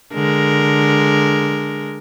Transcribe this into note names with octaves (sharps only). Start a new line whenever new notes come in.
D3 G#3 A#4